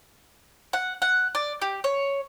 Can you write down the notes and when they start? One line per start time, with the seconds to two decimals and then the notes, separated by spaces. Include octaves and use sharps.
0.73 F#5
1.02 F#5
1.35 D5
1.61 G4
1.84 C#5